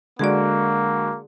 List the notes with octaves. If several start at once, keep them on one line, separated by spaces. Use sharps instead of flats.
D3 G#3 A#3 F#4 G#4 D5